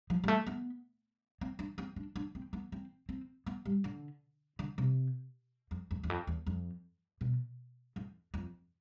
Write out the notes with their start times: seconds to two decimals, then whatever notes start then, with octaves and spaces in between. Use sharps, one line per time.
0.10 F3
0.24 G3
0.28 A3
0.47 B3
1.41 C4
1.59 D4
1.78 C4
1.96 D4
2.16 D4
2.35 C4
2.53 B3
2.72 C4
3.09 C4
3.46 B3
3.65 G3
3.84 D3
4.59 D3
4.78 C3
5.71 F2
5.91 F2
6.03 E2
6.10 F2
6.27 E2
6.47 F2
7.21 B2
7.96 F2
8.34 F2